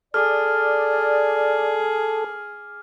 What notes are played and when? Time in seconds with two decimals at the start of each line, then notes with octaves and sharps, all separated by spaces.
0.14 G#4 A4 D5 D6 F6